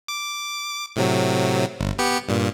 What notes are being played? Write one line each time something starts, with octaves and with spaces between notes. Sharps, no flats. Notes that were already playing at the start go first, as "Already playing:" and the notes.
D6
A2 C3 F#3
G1
B3 G4 C#7
G2 A#2